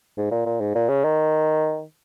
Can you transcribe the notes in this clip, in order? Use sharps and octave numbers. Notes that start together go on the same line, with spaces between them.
G#2
A#2
A#2
G#2
A#2
C#3
D#3